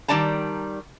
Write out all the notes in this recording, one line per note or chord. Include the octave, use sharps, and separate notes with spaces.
D#3 G3 D5 A5 A#5